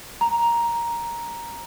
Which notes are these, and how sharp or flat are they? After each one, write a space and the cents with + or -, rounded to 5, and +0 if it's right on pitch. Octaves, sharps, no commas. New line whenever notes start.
A#5 +5